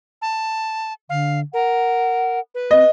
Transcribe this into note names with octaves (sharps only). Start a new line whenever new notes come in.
A5
D3 F5
A#4 F#5
B4
C4 D#5